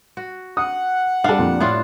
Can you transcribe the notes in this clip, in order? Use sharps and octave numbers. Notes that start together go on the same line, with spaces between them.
F#4
F#5 D#6
G3 D4 A4 D5 F5
F2 A#2
A2 D4 E4 F4